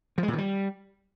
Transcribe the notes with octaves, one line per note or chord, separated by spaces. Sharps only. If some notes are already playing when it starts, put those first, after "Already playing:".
F3
G#3
A#2
D#3
G3